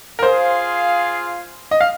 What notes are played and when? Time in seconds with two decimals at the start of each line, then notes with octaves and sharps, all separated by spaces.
0.19 A#4
0.23 F4 G#4 C5 F5
1.71 D#5
1.81 F5